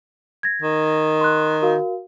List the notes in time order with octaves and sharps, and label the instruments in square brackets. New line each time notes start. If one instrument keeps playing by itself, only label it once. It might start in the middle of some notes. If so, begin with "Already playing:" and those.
[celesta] G#6 A#6
[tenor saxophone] D#3
[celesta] C6 F#6
F#4 A#4 F5